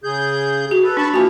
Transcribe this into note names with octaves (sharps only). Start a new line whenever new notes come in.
C#3 G#4 G6
F#4
A4 B4
D4 A5 B5 C#6
E3 F3 A#3 F#4 G#5